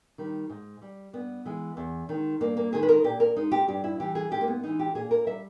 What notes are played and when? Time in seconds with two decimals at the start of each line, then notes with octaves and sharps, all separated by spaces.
0.18 D#3 G3
0.50 G#2
0.82 G3
1.13 G2 B3
1.45 E3 G#3
1.77 E2
2.09 D#3 G#3
2.40 G2 A#3
2.57 A#3
2.72 D#3 G#3 G#4
2.83 B4
2.89 A#4
3.04 A#2 G4
3.20 A#4
3.36 G#3 D#4
3.52 G4
3.68 G2 G4
3.84 E4
4.00 E3 G3 G4
4.15 G#4
4.31 G#2 G4
4.41 A#3
4.48 B3
4.63 E3 G#3 D#4
4.79 G4
4.95 A#2 G#4
5.11 A#4
5.27 G3 E5